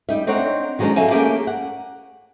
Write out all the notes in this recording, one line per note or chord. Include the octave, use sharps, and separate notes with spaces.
G3 D#4 E5
C4 D4 D#4 C#5 F#5
D#3 F#3 G#3 B3 C#4 D4
D3 F#3 E5 F5 G#5
A3 A#3 C#4 G4 G#4
F#5